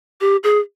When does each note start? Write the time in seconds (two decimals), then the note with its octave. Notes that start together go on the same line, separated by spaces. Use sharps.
0.21 G4
0.43 G#4